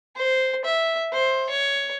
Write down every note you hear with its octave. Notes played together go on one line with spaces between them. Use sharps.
C5
E5
C5
C#5